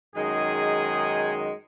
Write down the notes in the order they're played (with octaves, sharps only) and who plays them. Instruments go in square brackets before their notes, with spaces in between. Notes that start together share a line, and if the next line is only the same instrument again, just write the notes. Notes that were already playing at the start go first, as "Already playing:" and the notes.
[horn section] F#2 D#3 G#3 D#4 G#4